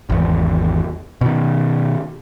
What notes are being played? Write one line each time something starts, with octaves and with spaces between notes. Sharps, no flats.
G#1 E2
B2 D#3